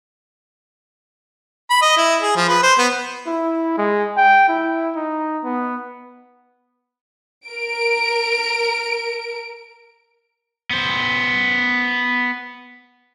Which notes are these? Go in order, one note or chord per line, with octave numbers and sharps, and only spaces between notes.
B5
D#5
E4
G#4
F3
B4
C5
B3
E4
G#3
G5
E4
D#4
B3
A#4 D7
B3 C5